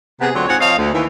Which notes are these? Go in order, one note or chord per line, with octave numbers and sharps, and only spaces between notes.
C3 B3 G#4
D2 D3 F#3 C4 F4 C#5
G#2 C4 F4 G#4 C#5 F#5
F3 C4 C#5 D#5 F5
D2
D#2 E3